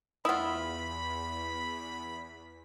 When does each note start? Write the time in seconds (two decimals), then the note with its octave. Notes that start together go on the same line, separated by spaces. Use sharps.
0.25 E2 E4 F4 F#5 B5 D#6 B6